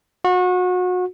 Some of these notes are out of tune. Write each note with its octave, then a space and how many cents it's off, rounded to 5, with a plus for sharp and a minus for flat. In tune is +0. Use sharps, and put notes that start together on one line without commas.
F#4 -30